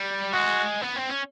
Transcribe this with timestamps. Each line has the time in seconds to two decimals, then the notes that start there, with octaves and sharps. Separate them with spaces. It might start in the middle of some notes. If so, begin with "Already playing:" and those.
Already playing: G3
0.33 G#3 F#4
0.82 B3
0.96 C4
1.09 C#4